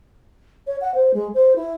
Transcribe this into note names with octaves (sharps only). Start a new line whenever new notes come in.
C#5
F#5
C5
G#3
C5
E4